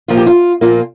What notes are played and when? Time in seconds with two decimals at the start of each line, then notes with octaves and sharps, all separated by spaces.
0.08 A#2 F3 A#3 F4
0.17 G4
0.27 F4
0.61 A#2 F3 A#3 F4